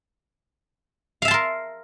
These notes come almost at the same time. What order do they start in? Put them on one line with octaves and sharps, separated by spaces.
F5 E5 A5 C6 A#4